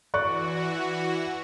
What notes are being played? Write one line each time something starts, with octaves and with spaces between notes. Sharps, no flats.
E3 F#4 D5 C#6 F#6